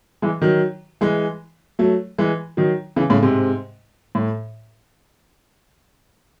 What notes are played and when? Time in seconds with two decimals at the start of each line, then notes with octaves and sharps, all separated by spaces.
0.22 E3 G#3
0.42 D#3 F#3
1.01 E3 G#3
1.79 F#3 A3
2.18 E3 G#3
2.57 D#3 F#3
2.96 C#3 E3
3.10 A2 C#3
3.23 G#2 C3
4.15 A2